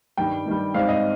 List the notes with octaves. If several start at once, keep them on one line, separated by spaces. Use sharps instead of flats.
G2 D#3 G3 G5
G2 D#3 G3
G#2 G3 C4 D#4 F5
D#5